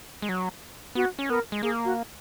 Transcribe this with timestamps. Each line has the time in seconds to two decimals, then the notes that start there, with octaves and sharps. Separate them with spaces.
0.22 G#3
0.29 F#3
0.95 B3 F#4
1.19 C#4
1.29 B3 A#4
1.52 G#3
1.63 A#3 G#4
1.85 F#4